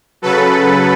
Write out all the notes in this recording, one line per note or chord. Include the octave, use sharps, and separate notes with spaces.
C#3 F#3 A4 B4